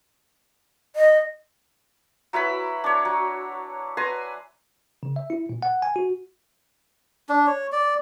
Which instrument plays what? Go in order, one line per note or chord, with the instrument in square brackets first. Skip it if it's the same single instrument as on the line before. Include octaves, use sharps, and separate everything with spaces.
[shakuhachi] D#5
[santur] F#3 E4 B4 B5
D4 C#5
F#3
B4 G#5 A#5 C6
[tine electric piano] C#3
E5
E4
A#2
F#5
G#5
F#4
[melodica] D4
C#5
D5